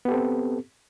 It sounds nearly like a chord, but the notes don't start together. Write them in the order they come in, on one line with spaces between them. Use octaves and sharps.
B3 G4 A4 C4